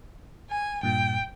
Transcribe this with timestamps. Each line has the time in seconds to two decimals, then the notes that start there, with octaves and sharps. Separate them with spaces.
0.50 G#5
0.83 G2 A#2 G5